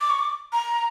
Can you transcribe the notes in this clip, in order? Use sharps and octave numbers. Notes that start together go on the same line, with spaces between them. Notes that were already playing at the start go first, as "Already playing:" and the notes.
D6
C#6
D6
A#5